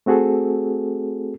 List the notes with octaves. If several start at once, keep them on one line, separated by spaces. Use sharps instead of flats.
A3 C4 F#4 G#4 A4